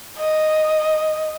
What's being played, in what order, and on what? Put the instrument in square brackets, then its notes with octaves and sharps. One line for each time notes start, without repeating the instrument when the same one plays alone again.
[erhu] D#5